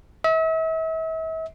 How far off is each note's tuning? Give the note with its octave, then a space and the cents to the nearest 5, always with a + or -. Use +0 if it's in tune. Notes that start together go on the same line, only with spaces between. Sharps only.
E5 -40